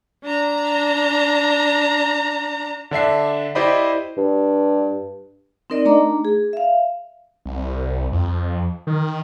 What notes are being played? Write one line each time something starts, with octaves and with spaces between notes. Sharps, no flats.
D4 A#5
D3 D4 E5 C7
E4 G4 C5 D5 D#5 B5
G2
C4 D#4 A#4 D5 D#5
A3 D4 D#4 A#5 D6
G#4
E5 F5
C2
F2
D#3